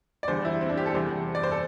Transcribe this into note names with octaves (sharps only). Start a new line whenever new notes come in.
D5
E2 D3 G3 C5
E4
C4
D4
G4
A4
E2 C3 G3 C5
D5
C5
A4